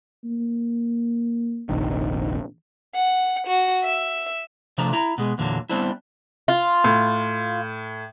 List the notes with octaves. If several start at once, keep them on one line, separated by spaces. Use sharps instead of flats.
A#3
F1 A#1 D#3
F#5
F#4
E5
C3 F3 A3 D4 A#5
E4 A#5
B2 G#3
E2 A#2 D3 F#3
G3 B3 C4 D4 E4
F4
A2